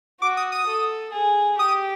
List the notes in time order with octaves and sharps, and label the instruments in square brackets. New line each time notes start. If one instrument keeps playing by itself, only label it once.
[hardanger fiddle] F#4 [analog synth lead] D6
[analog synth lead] D#6
D#6
[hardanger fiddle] A4
G#4
[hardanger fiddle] G4 [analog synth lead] D#6